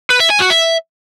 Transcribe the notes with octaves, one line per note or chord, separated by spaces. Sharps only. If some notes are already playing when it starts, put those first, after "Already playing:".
B4
E5
G#5
F#4
E5